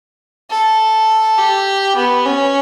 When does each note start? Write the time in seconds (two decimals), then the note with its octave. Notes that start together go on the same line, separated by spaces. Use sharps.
0.51 A4
1.38 G4
1.96 B3
2.25 C#4